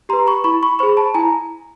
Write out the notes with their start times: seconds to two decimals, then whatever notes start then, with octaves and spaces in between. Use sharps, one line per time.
0.09 G4 A#5 C6
0.13 B4
0.27 B5 C#6
0.44 E4 B5 C#6
0.63 B5 C#6
0.79 G#4 C5 B5 C#6
0.97 A5 B5
1.14 E4 G#5 A#5